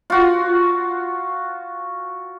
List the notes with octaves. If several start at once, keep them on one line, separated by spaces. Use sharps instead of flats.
F4 F#4